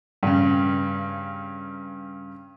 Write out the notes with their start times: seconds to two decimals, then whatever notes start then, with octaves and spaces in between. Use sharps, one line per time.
0.23 G2 C#3